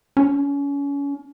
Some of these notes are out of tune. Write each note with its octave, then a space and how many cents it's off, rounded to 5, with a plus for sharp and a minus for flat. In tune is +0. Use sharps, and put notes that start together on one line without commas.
C#4 +30